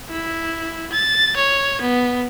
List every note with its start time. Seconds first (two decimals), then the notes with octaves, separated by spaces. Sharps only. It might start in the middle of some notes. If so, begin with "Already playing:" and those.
0.10 E4
0.92 A6
1.37 C#5
1.81 B3